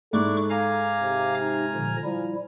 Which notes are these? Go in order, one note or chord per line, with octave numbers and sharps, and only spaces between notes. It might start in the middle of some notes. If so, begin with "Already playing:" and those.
G#2 E4 A4 D5 C#6 D6 F#6
F5 G#5 A#5 D6 F6
C3
D#4
A#2 D3 F3
F3 G3 E4